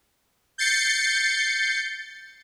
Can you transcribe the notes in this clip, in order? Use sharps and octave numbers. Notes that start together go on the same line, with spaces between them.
G6 A6 C7 C#7